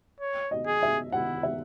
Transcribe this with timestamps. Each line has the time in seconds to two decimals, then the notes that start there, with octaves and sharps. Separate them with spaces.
0.20 C#5
0.51 D#5
0.67 G#4
0.83 E5
1.12 E4 F#5
1.43 E5